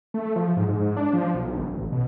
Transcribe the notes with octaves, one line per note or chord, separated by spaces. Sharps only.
A3
F3
G#2
G#2
D4
F3
B1
G1
A1
B2